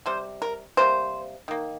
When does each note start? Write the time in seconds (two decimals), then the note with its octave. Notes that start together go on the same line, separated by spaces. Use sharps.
0.06 C3 G3 C5
0.42 A#4
0.77 C3 G3 A#3 C5
1.48 D#3 A#3